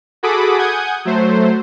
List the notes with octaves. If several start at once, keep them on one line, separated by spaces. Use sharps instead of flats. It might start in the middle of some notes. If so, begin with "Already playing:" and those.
F#4 G#4 A4 B5 D6 D#6
F#5 G#5 D#6 G6 G#6
F#3 A3 C5